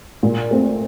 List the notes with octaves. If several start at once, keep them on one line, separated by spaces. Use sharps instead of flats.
A#2
A3 C4